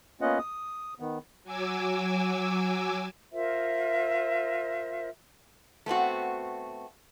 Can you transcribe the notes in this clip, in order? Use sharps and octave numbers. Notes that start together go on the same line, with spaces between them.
A#3 B3 C#4 F4 D#5 F#5
D#6
D#3 B3
F#3 G#5 D6 E6
F4 A#4 C5 E5
A3 B3 C4 F#4